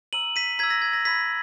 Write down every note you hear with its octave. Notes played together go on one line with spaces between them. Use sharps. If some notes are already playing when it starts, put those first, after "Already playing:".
A#5 E6 D#7 F#7
B6 D#7
A#5 E6 G#6 B6
A#6
G#6
A#6
B5 E6 G#6 B6